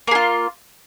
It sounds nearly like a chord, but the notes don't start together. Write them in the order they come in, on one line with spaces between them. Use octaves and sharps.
A#3 G#4 F4